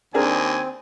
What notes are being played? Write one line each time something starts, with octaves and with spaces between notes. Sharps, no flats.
D#2 C4 D4 G#4 A#4 G#5